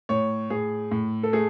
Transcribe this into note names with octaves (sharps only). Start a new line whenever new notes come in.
A2 C#5
A2 G#4
A2
A4
A3 G#4